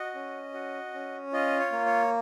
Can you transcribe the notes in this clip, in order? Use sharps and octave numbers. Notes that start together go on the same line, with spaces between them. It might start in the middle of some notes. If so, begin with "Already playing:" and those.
Already playing: F#4 D#5
C#4
F#4
C#4
F4 D#5
C#5
A#3
C#5